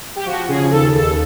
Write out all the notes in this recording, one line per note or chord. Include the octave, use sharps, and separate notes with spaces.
G4
F3 F#4
C#3 G#4
D#2 A4
D#2 A4